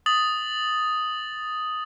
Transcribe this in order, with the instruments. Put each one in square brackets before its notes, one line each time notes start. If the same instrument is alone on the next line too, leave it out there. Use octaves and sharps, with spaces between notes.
[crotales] D#6 A6 F#7